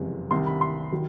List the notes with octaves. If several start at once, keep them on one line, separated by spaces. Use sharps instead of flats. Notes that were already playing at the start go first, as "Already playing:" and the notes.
Already playing: F#1 F2 C3 E3 G#3
C2 C3 D#3 C6
B5
C6
D#3 F#3